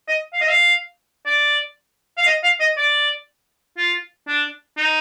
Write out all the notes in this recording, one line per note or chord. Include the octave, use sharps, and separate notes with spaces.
D#5
F5
D#5
F5
D5
F5
D#5
F5
D#5
D5
F4
D4
D#4